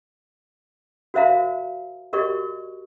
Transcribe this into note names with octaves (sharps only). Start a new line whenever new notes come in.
F#4 A#4 C5 E5 F5 A#5
F#4 G4 A#4 D5 D#5 C#6